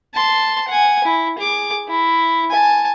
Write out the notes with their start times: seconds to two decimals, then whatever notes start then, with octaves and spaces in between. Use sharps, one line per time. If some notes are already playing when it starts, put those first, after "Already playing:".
0.15 A5 C6
0.68 F#5 G#5
1.04 E4
1.39 G#4 D6
1.88 E4
2.51 G#5 A5